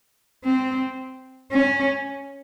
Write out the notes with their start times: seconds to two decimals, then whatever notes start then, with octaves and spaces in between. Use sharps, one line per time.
0.45 C4
1.52 C#4